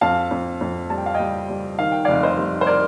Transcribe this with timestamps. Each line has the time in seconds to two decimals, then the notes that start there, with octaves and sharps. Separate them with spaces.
0.01 F2 F5 A5
0.31 F2
0.61 F2
0.90 G3 A5
0.98 G5
1.06 F5
1.15 D#5 G5
1.20 G3
1.49 G3
1.79 D#3 F5
1.92 G5
2.05 D5 F5
2.08 F1
2.23 C5 D#5
2.38 G3
2.61 C5
2.67 A#4 D5